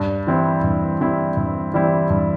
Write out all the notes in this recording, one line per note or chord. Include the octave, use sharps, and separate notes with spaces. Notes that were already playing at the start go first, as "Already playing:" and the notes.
Already playing: G2
E3 G3 C4 E4
G2
E3 G3 C4 E4
G2
E3 G3 C4 E4
G2